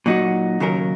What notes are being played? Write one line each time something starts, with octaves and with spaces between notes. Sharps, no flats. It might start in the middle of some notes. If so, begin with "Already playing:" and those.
A#2 F#3 D#4 F#4
D#2 C#3 F#3 C#4 A#4